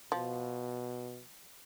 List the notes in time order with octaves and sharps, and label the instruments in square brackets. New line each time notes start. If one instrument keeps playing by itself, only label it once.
[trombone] B2 [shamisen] F3